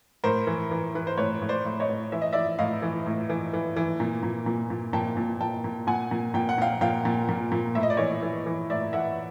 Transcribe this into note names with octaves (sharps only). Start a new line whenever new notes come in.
A2 A#4 C5
E3
E3
E3 B4
C5
A2 B4 C#5
A2
C5 D5
A2
C#5 D#5
A2
E3 E5
D#5
E3 D5 E5
A2 D#5 F5
E3
A2
E3
E3
E3
A#2
A#2
A#2
A#2
A#2 G5 A5
A#2
A#2 G5 A5
A#2
A#2 F#5 G#5
A#2
A#2 G5
F#5
A#2 F5 G5
A#2 F5 G5
A#2
A#2
A#2
A2 E5
D#5
D5
E3 C#5 D#5
E3
E3
A2 D5 E5
E3 E5 F#5